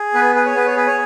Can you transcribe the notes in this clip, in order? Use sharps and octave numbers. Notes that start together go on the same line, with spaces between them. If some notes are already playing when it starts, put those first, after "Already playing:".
Already playing: G#4
B3 B4
G#4 B4
C#5
B3 B4
C#5
G#4 B4
C#5